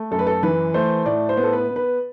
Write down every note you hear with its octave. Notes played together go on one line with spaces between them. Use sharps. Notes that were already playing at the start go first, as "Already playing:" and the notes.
Already playing: A3
F#2 A4
B4
A4
E3 B4
A3 C5
A2 D5
C5
B3
A4
B4
B3
B4